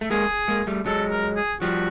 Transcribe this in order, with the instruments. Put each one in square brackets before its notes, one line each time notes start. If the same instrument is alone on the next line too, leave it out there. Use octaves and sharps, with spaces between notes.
[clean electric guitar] A3
[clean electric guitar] G#3 A#3 [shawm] G#4
[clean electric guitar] G#3 A#3
G3 A3
[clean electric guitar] F#3 G#3 [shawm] A4
[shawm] A#4
G#4
[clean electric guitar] F3 G3 [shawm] F#4